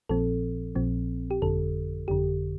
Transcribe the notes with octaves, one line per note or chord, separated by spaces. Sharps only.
A#1 A#2 F3 C4 A4
A#1 A#2 F3 C4
G4
G1 F2 D3 A4
G1 F2 D3 G4